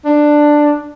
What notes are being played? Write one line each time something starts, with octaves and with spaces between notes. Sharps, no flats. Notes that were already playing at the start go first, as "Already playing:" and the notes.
D4